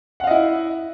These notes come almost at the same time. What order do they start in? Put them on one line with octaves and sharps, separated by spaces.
F#5 F5 D#5 E4